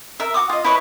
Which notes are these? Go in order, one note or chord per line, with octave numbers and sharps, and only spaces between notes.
A#4 E5
F#4 D6 D#6
F4 D#5
E4 B4 C#5 D#5